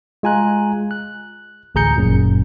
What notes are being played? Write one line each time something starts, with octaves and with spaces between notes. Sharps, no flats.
G#3 F4 G#5 A#5 F#6
F#6
A1 D2 G#4 A#5 G6 C#7
G1 F#2 A#2